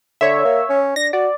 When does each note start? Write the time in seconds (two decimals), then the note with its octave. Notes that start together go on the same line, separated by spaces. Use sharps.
0.21 D3 C#5 E5
0.45 A#3
0.69 C#4
0.96 D4 A#6
1.13 F#4 D5